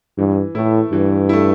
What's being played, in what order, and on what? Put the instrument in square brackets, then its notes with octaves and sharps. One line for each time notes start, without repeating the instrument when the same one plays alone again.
[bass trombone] G2 [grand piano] E3
[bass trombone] A2 [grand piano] A3 E4
[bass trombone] G2 [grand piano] E3
[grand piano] A3 E4